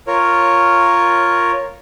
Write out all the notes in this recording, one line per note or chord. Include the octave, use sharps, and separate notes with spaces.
F4 A#4 C#5